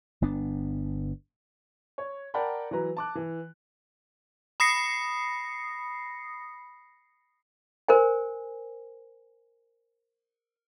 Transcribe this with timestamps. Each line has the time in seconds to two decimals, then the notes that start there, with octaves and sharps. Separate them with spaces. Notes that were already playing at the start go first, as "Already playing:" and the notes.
0.22 G1 B3 D4
1.98 C#5
2.34 A#4 D5 F#5 G5 A5 B5
2.71 E3 F#3 B4 A#5
2.97 A5 D6 F#6
3.15 E3
4.60 B5 D#6 A#6 C7 C#7
7.88 A#4 C5 G#5